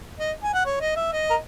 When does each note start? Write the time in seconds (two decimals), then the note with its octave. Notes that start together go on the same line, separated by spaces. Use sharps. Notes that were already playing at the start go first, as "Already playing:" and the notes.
0.19 D#5
0.43 G#5
0.54 F#5
0.66 C#5
0.81 D#5
0.96 E5
1.12 D#5
1.30 A#4